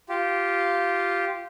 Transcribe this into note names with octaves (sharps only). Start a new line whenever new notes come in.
F4 G4